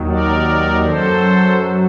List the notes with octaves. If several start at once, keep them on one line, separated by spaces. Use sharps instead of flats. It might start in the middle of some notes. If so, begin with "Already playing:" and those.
Already playing: D#2 D#3 F#3
A#4 D5
F#2 F#3 A4 C5